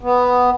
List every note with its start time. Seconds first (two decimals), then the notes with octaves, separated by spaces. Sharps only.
0.03 B3